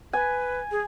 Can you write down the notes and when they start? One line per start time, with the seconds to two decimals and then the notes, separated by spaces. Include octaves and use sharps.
0.13 B4 G#5
0.71 G#4